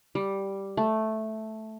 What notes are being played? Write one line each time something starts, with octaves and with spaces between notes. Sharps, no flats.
G3
A3